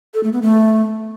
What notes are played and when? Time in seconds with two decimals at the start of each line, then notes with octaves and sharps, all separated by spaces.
0.14 A4
0.23 A3
0.33 B3
0.42 A3